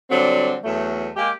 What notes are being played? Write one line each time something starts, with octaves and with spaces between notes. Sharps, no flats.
D3 F#3 G3 C4
E2 F#3 A3
G#3 A#3 G4